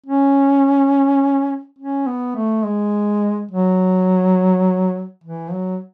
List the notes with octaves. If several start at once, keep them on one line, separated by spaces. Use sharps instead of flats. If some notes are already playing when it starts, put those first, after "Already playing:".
C#4
C#4
B3
A3
G#3
F#3
E3
F#3